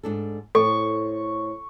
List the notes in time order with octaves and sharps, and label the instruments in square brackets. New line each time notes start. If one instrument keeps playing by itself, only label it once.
[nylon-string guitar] G#2 D4 A4
[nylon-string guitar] A2 C4 [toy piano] A4 [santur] C#6